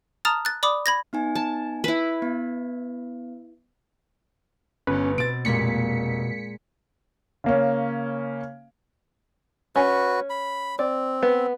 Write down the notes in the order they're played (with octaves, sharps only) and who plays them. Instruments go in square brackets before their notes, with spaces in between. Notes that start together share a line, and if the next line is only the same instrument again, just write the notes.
[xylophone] A5 A#5 D#6 F6 A6
F#6 A6
D5 B5 D6 D#6
B5 G#6 A#6
[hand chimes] B3 D#4 G#5
[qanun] A5
E4 B4
[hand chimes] B3
[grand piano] G1 [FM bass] C#4 [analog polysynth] B4
[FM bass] B2 [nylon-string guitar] C4 [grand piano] A6 D7
[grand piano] F1 [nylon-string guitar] A#2 G#3 A#3 [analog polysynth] B6 C#7
[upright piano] C#3 A#3 C#4
[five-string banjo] C#4 [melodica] F#4 B4
[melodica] B5
[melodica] C4 [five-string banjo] D5
[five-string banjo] B3